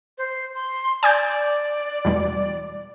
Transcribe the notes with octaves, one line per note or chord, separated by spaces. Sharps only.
C5
C6
D5 G#5 D6 G6
E2 B2 G3